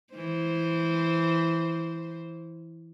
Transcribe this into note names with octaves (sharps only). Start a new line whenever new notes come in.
E3 C5